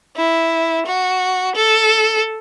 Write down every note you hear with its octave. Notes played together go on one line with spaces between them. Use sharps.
E4
F#4
A4